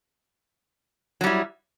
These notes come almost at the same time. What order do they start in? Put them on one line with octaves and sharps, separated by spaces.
F#3 G3 E4